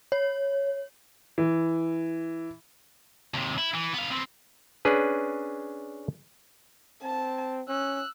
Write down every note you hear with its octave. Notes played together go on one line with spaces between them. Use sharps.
C#5
E3
D#2 C3
E4
E3
B3 F5
B3 C4
C#4 D4 G#4 B4
C4 A5
C#4 E6 F#6